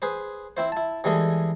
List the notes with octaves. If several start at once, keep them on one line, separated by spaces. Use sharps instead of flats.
G#4 B4 C5
C4 E4 C5
E4 A5
E3 G3 G#3 G#4 A4